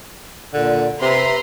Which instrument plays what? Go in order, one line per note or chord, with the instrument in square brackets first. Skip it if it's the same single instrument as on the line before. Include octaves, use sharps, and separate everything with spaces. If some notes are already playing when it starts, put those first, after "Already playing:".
[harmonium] A#2 [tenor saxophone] D3
[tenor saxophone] C3 [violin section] B4 A#5 C6 [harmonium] E5